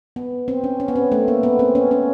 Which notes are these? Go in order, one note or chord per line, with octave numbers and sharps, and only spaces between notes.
B3
C4
C#4
C#4
B3
C4
A3
A#3
B3
C4
C#4
C#4